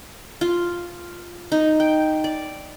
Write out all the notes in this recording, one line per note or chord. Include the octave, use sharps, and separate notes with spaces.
F4
D#4
G5
D5